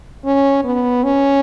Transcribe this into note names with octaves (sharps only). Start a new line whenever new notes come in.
C#4
B3
C#4